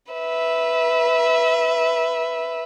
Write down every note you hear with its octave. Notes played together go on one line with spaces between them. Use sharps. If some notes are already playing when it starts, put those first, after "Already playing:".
B4 E5